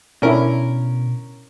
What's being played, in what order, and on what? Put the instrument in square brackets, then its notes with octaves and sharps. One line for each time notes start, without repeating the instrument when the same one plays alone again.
[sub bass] B2 [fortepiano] C#4 A#4 [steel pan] D4 E4